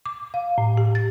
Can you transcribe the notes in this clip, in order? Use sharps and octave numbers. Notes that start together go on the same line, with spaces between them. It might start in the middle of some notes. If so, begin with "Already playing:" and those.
D6
F5
A2
G4
A6